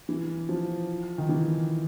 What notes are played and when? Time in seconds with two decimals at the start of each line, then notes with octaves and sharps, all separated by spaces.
0.09 E3
0.49 F3
1.18 D#3
1.29 E3